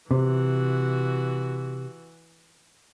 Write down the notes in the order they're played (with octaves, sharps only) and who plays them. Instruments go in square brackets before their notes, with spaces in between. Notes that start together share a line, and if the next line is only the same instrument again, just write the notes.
[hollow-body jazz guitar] C3 [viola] E3 F#4